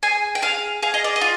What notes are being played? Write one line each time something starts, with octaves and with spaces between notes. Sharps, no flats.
G#4 G#5
G5
G#4 F5
G#4 F5
D#5
D5
D#5
F4